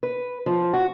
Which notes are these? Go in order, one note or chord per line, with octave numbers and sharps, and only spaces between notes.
B4
F3
F#4